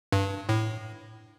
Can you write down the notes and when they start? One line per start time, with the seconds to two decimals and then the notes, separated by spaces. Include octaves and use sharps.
0.12 G2
0.49 A2